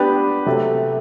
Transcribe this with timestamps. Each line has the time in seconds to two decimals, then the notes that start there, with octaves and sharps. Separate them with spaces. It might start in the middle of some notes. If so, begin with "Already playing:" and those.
Already playing: B3 D4 G4 B4
0.46 C3 F#3 A3